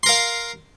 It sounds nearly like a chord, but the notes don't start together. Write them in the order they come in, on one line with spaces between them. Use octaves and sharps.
C6 A#4 F5